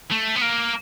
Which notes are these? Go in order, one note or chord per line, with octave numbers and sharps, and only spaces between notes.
A3
B3
A#3